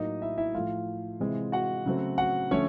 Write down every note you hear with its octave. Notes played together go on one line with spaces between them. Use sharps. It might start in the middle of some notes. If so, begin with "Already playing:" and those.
Already playing: A2 F#3 A#3 D#4 D#5
E4 E5
E4 E5
A2 F3 A3 F4 F5
C3 E3 G#3 C4
F#4 F#5
C#3 F#3 A3 C4
F#4 F#5
D3 F3 A3 C#4 C#5